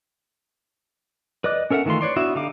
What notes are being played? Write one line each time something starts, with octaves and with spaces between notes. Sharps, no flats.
B4 D5 D#5 D6 F#6
C#4 A4 A#4 E5 F#5
D#3 E3 A3 F4 C6
B4 C#5 D5 C6
B3 D4 E4 F#4 E5
D3 D#4 G4 F5 D6